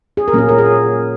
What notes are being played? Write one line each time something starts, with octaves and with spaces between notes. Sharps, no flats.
G#4
A#4
A#2 F#3 A#3 C#4 G#4
A#4
G#4